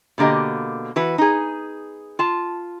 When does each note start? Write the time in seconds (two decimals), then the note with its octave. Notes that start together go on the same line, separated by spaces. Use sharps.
0.18 B2 D3 A#3 G4 D#5
0.96 E3 F#4 B4
1.18 D#4 G#4
2.19 F4 A5